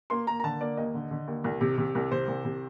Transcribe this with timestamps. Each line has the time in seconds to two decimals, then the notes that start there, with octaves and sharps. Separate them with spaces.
0.10 A#3 C6
0.27 A#3 A#5
0.40 A#5
0.44 D3 A5
0.61 A#3 D5
0.77 D#2 D#5
0.94 D3
1.11 D3
1.27 D#2
1.44 C2
1.61 C3
1.78 C3
1.95 C2
2.12 C3 C5
2.28 C2
2.45 C3